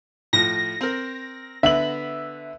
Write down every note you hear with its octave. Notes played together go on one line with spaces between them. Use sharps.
A2 F3 A#6
C4 A#4
D3 B3 E5 F#7